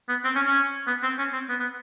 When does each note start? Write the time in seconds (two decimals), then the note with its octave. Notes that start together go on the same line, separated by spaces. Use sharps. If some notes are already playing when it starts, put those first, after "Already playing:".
0.09 B3
0.25 C4
0.35 C#4
0.46 C#4
0.87 B3
1.03 C4
1.18 C#4
1.33 C4
1.49 B3
1.60 B3